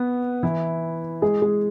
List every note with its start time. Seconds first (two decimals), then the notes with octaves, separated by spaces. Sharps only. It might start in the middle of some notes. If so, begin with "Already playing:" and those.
Already playing: B3 B4
0.43 E3 E4
1.22 G#3 G#4
1.42 G#3 G#4